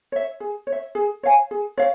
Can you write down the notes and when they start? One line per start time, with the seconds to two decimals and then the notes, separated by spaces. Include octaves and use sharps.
0.12 C#5 E5
0.40 G#4
0.67 C#5
0.72 E5
0.95 G#4
1.23 C#5 F5 G#5
1.51 G#4
1.77 C#5 F5